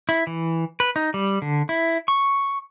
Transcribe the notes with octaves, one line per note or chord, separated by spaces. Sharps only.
E4
E3
B4
D#4
G3
D3
E4
C#6